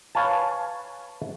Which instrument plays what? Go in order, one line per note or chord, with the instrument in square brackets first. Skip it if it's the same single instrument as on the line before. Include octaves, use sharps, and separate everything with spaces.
[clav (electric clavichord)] B4 C#5 F5 G#5 A5